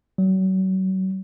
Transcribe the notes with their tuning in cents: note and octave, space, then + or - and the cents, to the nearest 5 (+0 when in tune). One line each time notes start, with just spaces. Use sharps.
F#3 +35